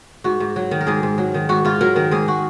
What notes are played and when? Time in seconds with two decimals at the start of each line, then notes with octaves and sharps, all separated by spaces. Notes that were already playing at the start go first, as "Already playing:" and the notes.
0.24 G#2 F#4
0.40 G#2
0.56 F#3
0.71 D#3
0.81 A#4
0.87 G#2 G#4
1.03 G#2
1.18 F#3
1.34 D#3
1.49 G#2 F#4
1.65 G#2 F4
1.81 F#3 A#4
1.96 D#3 A#4
2.11 G#2 G#4
2.28 F#4